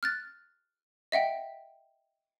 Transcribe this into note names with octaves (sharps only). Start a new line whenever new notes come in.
F6 F#6 A6
D#5 E5 F#5 G5